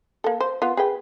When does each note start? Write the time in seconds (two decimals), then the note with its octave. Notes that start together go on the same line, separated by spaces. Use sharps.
0.24 A#3 A4
0.40 C5
0.62 B3 F4
0.77 G#4 B4 G5